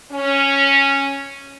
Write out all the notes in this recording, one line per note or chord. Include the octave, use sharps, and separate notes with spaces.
C#4